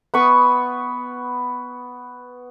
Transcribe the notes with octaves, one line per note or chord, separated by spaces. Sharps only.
B3 B5 C#6 D#6